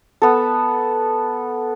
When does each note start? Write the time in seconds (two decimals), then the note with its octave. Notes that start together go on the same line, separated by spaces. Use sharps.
0.22 B3 A4